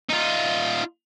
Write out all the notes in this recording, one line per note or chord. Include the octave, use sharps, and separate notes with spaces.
D#4 F4